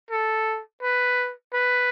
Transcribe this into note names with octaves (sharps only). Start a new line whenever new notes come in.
A4
B4
B4